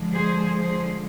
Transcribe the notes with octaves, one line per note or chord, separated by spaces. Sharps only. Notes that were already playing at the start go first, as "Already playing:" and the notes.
Already playing: D3 F3 G#3
G#4 C5
G#4 C5